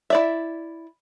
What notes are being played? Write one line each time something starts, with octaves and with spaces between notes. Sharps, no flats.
E4 D5 E5